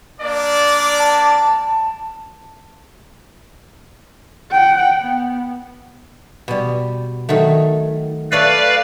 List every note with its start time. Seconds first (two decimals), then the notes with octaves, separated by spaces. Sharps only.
0.19 A#3 D4 D5
0.99 A5
4.51 F#5 G5
5.00 B3
6.48 B2 G3
7.29 D#3 F#3 A3
8.32 A4 B4 C#5 D5 E5 F5